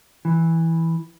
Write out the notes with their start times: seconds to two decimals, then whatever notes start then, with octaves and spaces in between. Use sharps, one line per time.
0.25 E3